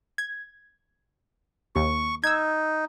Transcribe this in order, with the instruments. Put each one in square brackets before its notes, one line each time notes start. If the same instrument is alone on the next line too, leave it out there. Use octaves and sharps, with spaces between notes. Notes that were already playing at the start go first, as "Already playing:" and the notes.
[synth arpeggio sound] G#6
[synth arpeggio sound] D#2 [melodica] C#6
[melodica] D#4 [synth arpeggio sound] E6 G#6